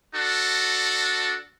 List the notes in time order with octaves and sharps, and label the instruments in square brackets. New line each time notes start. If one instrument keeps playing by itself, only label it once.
[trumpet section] D4 F#4 A4